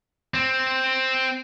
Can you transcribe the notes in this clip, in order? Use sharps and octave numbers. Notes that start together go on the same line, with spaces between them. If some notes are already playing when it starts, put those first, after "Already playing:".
C4